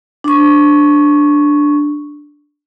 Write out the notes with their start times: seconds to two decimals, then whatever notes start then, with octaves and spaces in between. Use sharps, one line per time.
0.24 D4 C#6